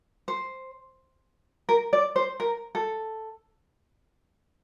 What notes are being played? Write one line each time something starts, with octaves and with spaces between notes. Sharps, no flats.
C5
A#4
D5
C5
A#4
A4